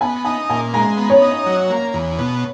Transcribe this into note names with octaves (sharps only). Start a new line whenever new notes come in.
B3 G#5
D#4 G#5
A#2 G#5
G#3 A#5
B3
C#5
D#4
F#3
A#3
E2
B2